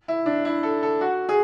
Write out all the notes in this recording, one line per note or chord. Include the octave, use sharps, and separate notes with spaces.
E4
D4
E4
A4
A4
F#4
G#4